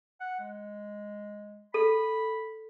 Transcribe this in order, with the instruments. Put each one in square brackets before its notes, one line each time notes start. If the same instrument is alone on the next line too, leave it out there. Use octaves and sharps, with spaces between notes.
[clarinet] F#5
G#3
[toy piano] A4 [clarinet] B5